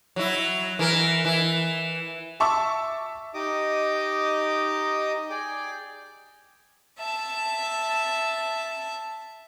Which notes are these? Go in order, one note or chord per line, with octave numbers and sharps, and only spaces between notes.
F#3 E4
E3 A#4
E3
E5 A5 C#6 D6 E6
D#4 G4 D#5 D6 D#6
G#4 D5 G5 D6
E5 A5